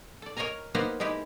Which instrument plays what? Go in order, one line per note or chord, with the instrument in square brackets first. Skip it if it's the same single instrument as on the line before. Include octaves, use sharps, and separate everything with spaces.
[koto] A4 D5
A#4 C#5 D#5 F5 G#5 A#5
A#3 B3 D#4 G4 B4 C5
G#3 D#4 E4 G4